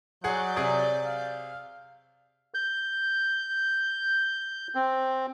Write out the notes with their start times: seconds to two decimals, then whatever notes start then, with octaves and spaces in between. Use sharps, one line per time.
0.24 F#3 G#4 D5 F#5 G6
0.56 C3 G#4 D#6
1.04 F5
2.54 G6
4.75 C4